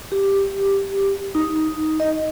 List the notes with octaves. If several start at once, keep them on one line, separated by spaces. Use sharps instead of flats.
G4
D#4
D#5